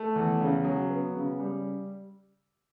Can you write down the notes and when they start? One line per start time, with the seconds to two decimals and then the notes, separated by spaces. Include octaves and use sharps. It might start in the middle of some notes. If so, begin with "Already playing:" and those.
Already playing: A3
0.16 E2
0.40 C#3
0.65 F#3
0.90 B3
1.14 C#3
1.40 G3